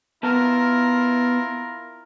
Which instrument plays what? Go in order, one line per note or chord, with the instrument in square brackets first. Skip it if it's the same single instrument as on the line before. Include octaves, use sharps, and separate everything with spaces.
[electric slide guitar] B3 B4 A5 [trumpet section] E4 F4 A#4